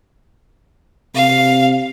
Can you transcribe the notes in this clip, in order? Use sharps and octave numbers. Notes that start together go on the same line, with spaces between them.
C3 F5